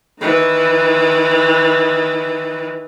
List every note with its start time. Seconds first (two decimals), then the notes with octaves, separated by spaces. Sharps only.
0.21 D#3 E3